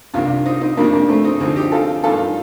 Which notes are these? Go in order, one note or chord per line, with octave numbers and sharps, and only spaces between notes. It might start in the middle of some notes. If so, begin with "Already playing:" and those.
C2 C3 D#3 D4 F4
C4 D#4
C4 D#4
F2 C3 D#3 A#3 D4
A#3 D4
A3 C4
C4 D#4
D2 D3 F3 C4 D#4
D#4 G4
F4 A4
G2 D#3 F4 A4